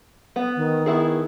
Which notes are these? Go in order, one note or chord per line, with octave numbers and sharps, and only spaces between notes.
B3
D#3
B3 E4 G#4